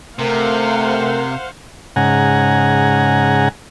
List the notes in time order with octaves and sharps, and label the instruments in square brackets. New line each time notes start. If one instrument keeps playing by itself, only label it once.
[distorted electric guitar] C3 [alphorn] A3 [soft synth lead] A#4 [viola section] C5 F5 F#5
[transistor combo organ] G#2 C#3 F#5 G#5 A#5